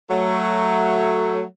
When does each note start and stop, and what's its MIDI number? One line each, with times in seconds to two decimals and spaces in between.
0.10 1.44 54
0.10 1.44 57